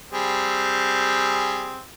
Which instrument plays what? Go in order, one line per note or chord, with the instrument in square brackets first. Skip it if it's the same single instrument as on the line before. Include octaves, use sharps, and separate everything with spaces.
[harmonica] G3 C4 G#4